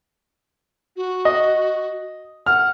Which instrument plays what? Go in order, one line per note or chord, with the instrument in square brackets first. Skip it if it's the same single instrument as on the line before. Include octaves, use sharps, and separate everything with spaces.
[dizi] F#4
[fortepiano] D#5
[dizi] F#5 [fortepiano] F6